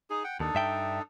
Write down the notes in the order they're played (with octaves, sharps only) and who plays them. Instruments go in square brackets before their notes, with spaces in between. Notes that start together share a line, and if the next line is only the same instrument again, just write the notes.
[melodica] D#4 G#4
F#5 G5
[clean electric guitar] D#2 [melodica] D4 D#4 A4
[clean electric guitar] G2 E5 G5